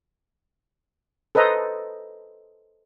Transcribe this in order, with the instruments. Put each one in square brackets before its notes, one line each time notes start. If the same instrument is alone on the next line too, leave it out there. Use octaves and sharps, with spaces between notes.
[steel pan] A4 B4 C5 D#5 A#5